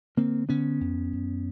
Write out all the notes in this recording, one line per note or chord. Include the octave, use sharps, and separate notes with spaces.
D3 A#3 C4
D3 B3 C#4
F2
F#2